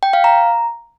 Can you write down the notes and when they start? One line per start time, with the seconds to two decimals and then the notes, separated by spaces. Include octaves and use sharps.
0.03 G5
0.13 F5
0.24 A#5